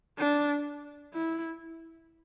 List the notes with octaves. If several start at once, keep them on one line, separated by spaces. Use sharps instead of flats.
D4
E4